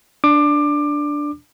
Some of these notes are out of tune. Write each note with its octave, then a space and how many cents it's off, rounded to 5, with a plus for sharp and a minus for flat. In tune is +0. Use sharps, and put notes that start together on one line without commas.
D4 +0 D6 +20